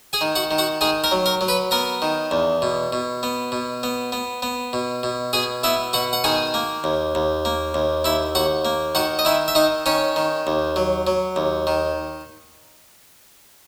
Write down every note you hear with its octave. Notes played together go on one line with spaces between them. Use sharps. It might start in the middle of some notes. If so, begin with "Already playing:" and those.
G#4 G#5
D#3
F#4 F#5
D#3
F#4 F#5
D#3 G#4 G#5
A#4 A#5
F#3
A#4 A#5
F#3
B4 B5
B3 A#4 A#5
D#3
E2
B2
B2
B3
B2
B3
B3
B3
B2
B2
B2 G#4 G#5
B3 E4 E5
B2 F#4 F#5
F#5
D#3 G#4 G#5
A#3
D#2
D#2
A#3
D#2
D#2 E4 E5
D#2 F#4 F#5
A#3
D#3 F#4 F#5
D#5
D#3 E4 E5
E5
D#3 D#4 D#5
D#3 C#4 C#5
D#3
D#2
F#3
F#3
D#2
D#3